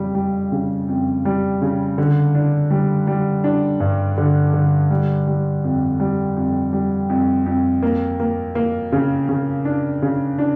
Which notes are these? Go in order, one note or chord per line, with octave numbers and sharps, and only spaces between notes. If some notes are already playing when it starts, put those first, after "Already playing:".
Already playing: F2 C#3 G3
G3
C#3
F2
G3
C#3
D3
D4
G3
G3
D4
G2
D3
D3
G3
G3
F2
G3
F2
G3
F2
F2
A#3
A#3
A#3
C#3
C#3
D4
C#3
D4